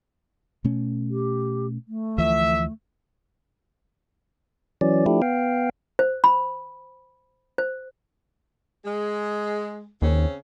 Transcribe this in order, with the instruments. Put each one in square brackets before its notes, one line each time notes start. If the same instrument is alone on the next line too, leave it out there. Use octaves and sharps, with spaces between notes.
[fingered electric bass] B2 A3 C#4
[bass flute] G4
A3
[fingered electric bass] D2 E3 F3 [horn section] E5
[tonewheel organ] E3 F#3 C#4 D5
F3 A3 D4 E4 G4
B3 F5 G5
[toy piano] C5
B5
C5
[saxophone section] G#3
[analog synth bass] D#2 [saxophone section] C#3 C4 C#4